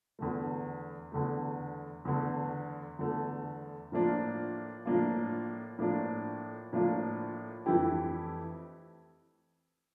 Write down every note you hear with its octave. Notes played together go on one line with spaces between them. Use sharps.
E2 D3 A3
E2 D3 A3
E2 D3 A3
E2 D3 A3
A2 F3 A#3 D4 F4
A2 F3 A#3 D4 F4
A2 F3 A#3 D4 F4
A2 F3 A#3 D4 F4
F2 E3 A3 E4 G4